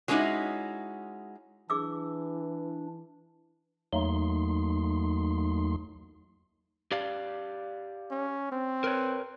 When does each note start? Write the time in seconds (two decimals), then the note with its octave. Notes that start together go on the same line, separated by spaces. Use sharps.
0.08 F#3 G#3 C#4 D#4 E4 F#4
1.70 E3 D4 G#4 D6 E6
3.93 E2 F#3 A3 A#3 D#4 C6
6.92 G4 D5 F5
8.11 C#4
8.52 C4
8.84 A#4 B4 C#5